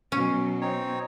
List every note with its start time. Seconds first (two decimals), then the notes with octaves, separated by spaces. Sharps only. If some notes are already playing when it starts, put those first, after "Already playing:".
0.12 B2 F#3 C#4
0.61 C4 D#4 C#5